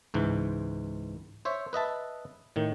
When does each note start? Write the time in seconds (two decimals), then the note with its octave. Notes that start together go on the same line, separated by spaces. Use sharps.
0.14 C#2 G#2 E3
1.45 C5 C#5 E5
1.73 B4 D#5 E5 A5
2.56 A2 D#3